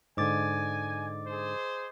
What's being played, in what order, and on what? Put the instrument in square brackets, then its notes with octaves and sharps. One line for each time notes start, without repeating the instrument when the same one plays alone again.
[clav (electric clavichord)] G#2 D3 [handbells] D#5 D6 A6 [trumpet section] G#5
[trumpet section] G#4 C5